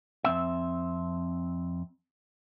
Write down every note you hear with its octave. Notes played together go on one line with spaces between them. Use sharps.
F2 C4 E5